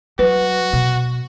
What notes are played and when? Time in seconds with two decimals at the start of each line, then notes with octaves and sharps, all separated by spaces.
0.19 F#3 F#4 B4
0.73 B2